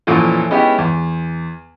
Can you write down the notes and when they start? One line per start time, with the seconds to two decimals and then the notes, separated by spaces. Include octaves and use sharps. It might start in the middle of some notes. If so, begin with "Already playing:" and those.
0.07 F2 A#2 E3 A3 C#4
0.50 G#3 B3 C#4 D#4 E4 G4
0.78 E2